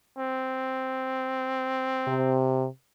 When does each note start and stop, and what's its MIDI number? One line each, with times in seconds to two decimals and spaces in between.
0.18 2.45 60
2.07 2.67 48